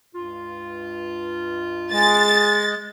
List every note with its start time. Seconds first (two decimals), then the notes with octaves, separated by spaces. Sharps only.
0.15 C#2 G2 F4
1.92 G#3 A6